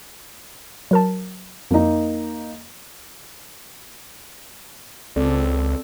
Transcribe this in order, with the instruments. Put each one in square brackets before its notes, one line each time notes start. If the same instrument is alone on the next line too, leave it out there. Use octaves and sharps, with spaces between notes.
[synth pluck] F#3 A#4 A5
[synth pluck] F2 [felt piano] A#3 D#4
[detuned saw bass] C#2 [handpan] C4 A4 D5